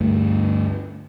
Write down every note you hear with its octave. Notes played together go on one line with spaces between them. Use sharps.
D2 G2 A3